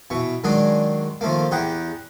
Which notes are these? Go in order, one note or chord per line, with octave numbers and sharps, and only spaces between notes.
B2 E3 C#6
D#3 F#3 G#3 D4 G#4
D#3 F3 A3 A#3
E2 G4 G#4 F#5 A#5